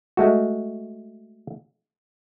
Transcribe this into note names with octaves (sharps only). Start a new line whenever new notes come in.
G#3 A3 F#4